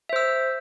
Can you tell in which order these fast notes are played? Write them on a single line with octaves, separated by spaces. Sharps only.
E5 C5 E6